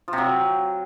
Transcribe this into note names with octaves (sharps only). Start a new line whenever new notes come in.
F3
C3
F#3